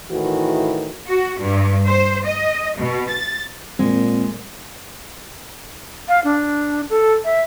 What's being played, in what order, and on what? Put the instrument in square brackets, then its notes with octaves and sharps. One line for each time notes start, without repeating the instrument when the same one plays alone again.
[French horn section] A2 D#3 E3 E4 F#4
[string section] F#4
G2
C5
D#5
B2
A6
[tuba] A#2 [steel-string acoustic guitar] G#3 [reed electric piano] C4
[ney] F5
D4
A4
E5